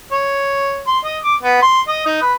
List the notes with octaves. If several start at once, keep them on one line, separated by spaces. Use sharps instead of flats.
C#5
C6
D#5
D6
B3
C6
D#5
D#4
B4